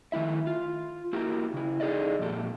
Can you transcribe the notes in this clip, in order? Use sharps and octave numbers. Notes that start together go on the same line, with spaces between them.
D#3 A3 E4 E5
F4
A#3 E4 F#4 G4 A#4
C#3 E4
D#4 G#4 A4 D5 D#5
F2 A#2 G4 A4